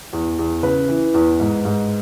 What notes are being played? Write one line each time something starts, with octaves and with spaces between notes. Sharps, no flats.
E2
E2
C#3 B4
E3
E2
G#2
G#2